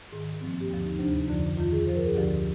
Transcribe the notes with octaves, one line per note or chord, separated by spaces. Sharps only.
G#2 D#3
G2 F3 C4
A#3
G4
D#2 D3 F3
D#4
D2 C3 F3 D4
D#4
F2 D3 F3
F2 D#3 F4
G#4
G2 F3 C5
A#4
G#4
D2 D3 F3 G4